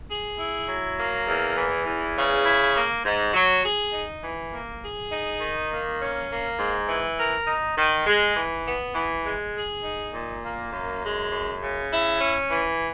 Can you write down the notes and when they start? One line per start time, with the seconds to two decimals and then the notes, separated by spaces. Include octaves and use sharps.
0.09 G#4
0.38 E4
0.68 F#3
0.97 A#3
1.27 E2
1.56 E3
1.86 E2
2.16 C#3
2.45 E4
2.75 A#3
3.05 G#2
3.33 F#3
3.63 G#4
3.92 D#4
4.23 E3
4.52 A#3
4.81 G#4
5.11 D#4
5.41 D#3
5.71 A#3
6.00 C#4
6.29 A#3
6.59 G#2
6.88 E3
7.18 A#4
7.47 D#4
7.77 D#3
8.06 G#3
8.36 E3
8.65 B3
8.95 E3
9.25 G#3
9.55 G#4
9.84 D#4
10.13 A#2
10.43 A#3
10.73 F#2
11.02 G#3
11.31 F#2
11.61 C#3
11.91 E4
12.20 C#4
12.50 E3